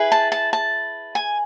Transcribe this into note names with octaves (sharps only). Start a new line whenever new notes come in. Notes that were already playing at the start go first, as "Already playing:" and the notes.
Already playing: E4 G#4 B4
A5
A5
A5
G#5